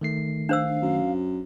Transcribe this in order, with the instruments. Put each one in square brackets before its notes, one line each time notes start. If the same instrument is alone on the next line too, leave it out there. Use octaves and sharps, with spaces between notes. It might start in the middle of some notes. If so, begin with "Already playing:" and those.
[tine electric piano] D#3 A3 C7
[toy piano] D4 C5 E6 [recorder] F5
[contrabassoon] F#2